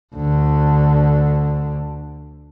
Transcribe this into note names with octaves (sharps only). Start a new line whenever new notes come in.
D2 D3